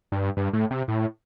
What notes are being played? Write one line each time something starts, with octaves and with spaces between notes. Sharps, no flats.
G2
G2
A2
C3
A2